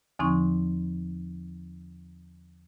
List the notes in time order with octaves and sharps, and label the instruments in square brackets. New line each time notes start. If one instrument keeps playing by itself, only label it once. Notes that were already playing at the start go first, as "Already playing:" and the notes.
[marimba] E2 D3 F3 C4 D#4 C#6